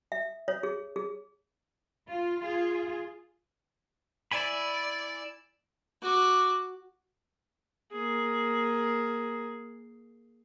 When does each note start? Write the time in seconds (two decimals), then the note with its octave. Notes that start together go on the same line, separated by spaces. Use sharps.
0.12 E5
0.48 C#5
0.63 G#4
0.96 G#4
2.09 F4
2.41 F4 G#4
4.31 E4 D5 G#5 B5
6.02 F#4 D6
7.92 A#3 G#4